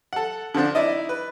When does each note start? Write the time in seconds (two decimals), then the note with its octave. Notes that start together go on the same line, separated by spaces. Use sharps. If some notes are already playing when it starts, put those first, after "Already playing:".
0.13 A4 F#5
0.54 D3 F3 C4 D4
0.75 D#4 E4 D5 D#5
1.09 B4